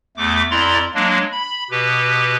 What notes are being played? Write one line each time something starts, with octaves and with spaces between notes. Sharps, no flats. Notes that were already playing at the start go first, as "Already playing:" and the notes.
E2 A3 D6
F2 E4 D5 A#5 C6
F#3 G#3 A#3 D4
B5
B2 G4 B4